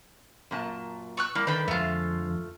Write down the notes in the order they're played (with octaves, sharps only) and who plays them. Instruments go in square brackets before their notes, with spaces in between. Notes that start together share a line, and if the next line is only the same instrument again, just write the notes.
[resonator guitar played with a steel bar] F#2 A#2 A5
[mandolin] C#6 E6 F#6
[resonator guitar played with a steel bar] G3 E4 [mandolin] A#3
[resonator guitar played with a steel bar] D3 D#3 B4 [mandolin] G5 B5
[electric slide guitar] F2 D3 [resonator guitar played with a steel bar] G#3 E5 [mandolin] A3 F4